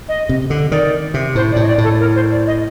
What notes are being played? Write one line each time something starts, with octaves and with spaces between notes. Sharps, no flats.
D#5
C3
D3
D#3 D5
C3
A2 C5
D5
A2
D#5
D5
A2
A4
A#4
C5
D5
D#5